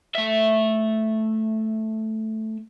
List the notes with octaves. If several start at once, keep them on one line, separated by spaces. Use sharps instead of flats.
A3 E5